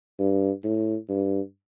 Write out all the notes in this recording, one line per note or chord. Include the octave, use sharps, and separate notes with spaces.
G2
A2
G2